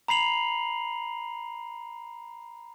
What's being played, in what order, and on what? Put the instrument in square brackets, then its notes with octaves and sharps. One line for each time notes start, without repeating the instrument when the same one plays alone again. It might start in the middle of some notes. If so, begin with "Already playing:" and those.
[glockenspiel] A#5 B5 C7 F7 F#7